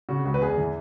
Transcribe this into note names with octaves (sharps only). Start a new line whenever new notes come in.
C#3 F#4
C#2 F#4
B4
E2 G#4
E3